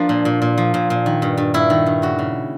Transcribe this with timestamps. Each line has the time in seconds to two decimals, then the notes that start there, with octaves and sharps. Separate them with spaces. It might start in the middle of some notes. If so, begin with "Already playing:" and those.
Already playing: F3 A#3 D4
0.09 A#2
0.25 A#2
0.42 A#2
0.58 F3
0.74 A#2
0.90 A#2
1.06 D#3
1.22 G2
1.37 G2
1.54 G2 E4
1.70 D#3
1.86 G2
2.02 C#3 F#4
2.19 C#3